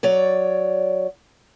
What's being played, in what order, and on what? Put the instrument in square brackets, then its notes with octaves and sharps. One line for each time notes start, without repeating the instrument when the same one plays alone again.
[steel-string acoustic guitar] F#3 C#5 D5